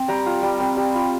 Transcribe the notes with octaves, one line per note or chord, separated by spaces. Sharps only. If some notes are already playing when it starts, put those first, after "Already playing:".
Already playing: C4
G3 G5 A#5
F4
G3
C4
G3
F4